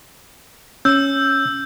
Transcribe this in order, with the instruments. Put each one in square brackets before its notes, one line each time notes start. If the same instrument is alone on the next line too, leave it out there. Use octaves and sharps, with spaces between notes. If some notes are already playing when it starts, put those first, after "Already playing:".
[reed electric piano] C#4 [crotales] E6 G6